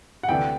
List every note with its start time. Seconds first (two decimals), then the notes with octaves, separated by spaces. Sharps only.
0.23 F#5
0.29 D2 C3 E3 A3 D4 G5